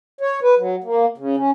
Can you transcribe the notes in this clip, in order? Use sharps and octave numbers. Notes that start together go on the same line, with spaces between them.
C#5
B4
F#3
A#3
C#3
C#4